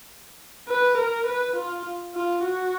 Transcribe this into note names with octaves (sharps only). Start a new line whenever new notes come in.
B4
A#4
B4
F4
F4
F#4